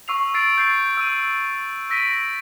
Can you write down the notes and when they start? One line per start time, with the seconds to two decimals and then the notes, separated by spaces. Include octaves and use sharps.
0.08 C#6 E6 C7 F7
0.34 E6 A6 C7 D7 F7
0.58 G6 A6 C7
0.97 E6 D#7
1.90 E6 A#6 B6 D7 D#7